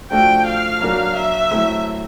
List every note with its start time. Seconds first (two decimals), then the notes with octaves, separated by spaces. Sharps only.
0.11 F3 A3 D4 F#4 A4 G5
0.46 F5
0.80 F#3 A#3 D4 F#4 A#4
1.16 E5
1.51 F#3 A3 C4 E4